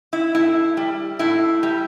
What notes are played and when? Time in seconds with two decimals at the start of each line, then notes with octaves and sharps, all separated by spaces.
0.13 E4
0.35 A2 E4
0.77 G3
1.19 A2 E4
1.63 G3